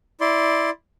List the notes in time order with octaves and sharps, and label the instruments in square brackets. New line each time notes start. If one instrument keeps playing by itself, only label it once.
[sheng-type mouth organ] E4 D5 C6